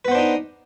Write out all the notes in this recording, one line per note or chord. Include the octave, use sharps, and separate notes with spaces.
B3 D4 D#4 B4 C5